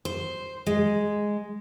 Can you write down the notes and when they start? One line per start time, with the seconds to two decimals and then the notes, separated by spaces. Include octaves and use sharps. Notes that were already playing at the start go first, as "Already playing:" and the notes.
0.05 C5
0.67 G#3